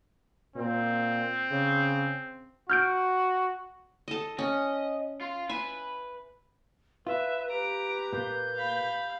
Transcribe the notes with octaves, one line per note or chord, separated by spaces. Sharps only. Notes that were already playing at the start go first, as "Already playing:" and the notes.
A#2 C4
C#3
F#4 F6 G6 D7
A4 D#5
C#4 D#5
F4
B4 E5 G#5
F4 B4 E5
G4 B4 A#5 D7
A#2 A#3 G6
F5 B5